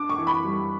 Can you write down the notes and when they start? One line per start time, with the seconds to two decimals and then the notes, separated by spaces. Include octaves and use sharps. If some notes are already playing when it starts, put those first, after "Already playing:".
Already playing: D4 D6
0.10 C#6
0.18 E3
0.27 B5
0.44 G3